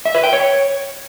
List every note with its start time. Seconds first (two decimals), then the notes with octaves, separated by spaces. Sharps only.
0.05 E5
0.15 B4
0.24 G5
0.33 C#5